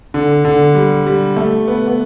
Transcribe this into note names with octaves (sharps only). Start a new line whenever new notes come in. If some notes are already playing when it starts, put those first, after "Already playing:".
D3
D3
G3
G3
A3
B3
B3